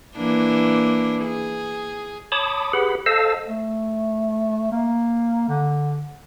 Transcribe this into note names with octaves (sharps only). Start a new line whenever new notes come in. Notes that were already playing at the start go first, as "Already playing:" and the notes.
E3 A#3 D4
G#4
C#5 A5 B5 D6 D#6
G4 G#4 B4 F#5 B5
A4 C5 D#5 F5 A5 E6
A3
A#3
D3